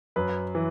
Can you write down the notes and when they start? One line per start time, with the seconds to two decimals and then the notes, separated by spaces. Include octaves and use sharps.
0.16 F#2 B4
0.55 E3